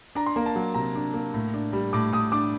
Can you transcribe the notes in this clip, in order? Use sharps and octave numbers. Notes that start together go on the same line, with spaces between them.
D4 A#5
C6
A#3 A#5
A5
F#3
C3 A#5
D4
A#3
A2
D4
G3
A2 D6
A2 D#6
D4 D6